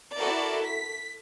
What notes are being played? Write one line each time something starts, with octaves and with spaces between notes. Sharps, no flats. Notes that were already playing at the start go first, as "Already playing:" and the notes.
E4 F#4 A4 A#4 D5
B6